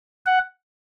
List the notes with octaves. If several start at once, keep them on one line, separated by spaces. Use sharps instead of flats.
F#5